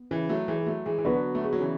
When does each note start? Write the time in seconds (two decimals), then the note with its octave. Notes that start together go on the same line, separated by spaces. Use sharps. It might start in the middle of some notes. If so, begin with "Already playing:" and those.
Already playing: B3
0.11 C#3 E3
0.29 F#3 A3
0.48 E3 G#3
0.61 G#3
0.67 F#3 A3
0.86 E3 G#3
0.98 E3
1.05 D3 F#3 B3 F#4 B4 D5
1.35 A3
1.44 G#3
1.53 F#3
1.60 C#3 E3